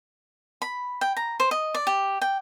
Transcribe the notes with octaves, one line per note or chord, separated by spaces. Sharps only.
B5
G5
A#5
C5
D#5
D5
G4
G5